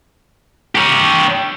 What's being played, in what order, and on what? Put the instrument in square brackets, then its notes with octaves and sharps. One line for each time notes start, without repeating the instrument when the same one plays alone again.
[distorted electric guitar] G4 C#5